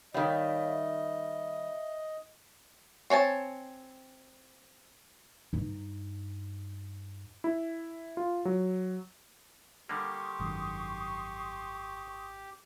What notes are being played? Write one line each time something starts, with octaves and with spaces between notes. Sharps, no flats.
D#3 G3 C#5 D#5 F5 B5
E5
C4 C#5 G#5 A5
G2 D#4
E4
F4
F#3
D3 G3 A#3 G4 C6 C#6 D#6
G#1 F#2 D#3